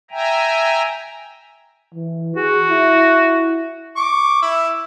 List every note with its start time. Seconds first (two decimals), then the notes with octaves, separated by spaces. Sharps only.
0.11 E5 G5 G#5 A#5
1.94 E3
2.36 F#4 G#4
2.69 E4
3.96 C#6 D6
4.42 E4 E6